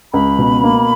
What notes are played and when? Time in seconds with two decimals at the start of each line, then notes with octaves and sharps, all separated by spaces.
0.13 C#2 B5
0.39 B2
0.64 A#3